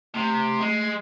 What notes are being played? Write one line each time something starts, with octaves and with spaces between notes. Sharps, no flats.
C3 A3
G#3